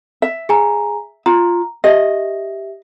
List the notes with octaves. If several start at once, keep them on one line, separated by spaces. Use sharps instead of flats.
E5
G#4 G#5 A#5
F4 A#5
G4 D#5 E5